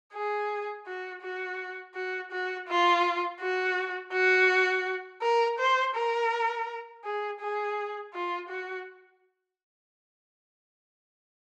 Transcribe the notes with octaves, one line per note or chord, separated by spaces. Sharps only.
G#4
F#4
F#4
F#4
F#4
F4
F#4
F#4
A#4
C5
A#4
G#4
G#4
F4
F#4